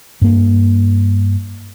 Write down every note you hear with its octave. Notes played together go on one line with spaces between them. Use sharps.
G2 A#3